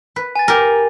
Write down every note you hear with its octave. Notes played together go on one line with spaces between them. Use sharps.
B4
G#5 A6
G4 A#4